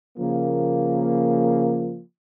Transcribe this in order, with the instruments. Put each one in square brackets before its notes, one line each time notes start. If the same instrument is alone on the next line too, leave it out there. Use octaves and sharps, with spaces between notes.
[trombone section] C#3 F3 A#3